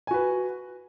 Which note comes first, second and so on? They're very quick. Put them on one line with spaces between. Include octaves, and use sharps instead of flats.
G#5 F#4 B4